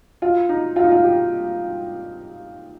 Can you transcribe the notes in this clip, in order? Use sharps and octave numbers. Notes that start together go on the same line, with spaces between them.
F4
D#4
F4
D#4
F4
G4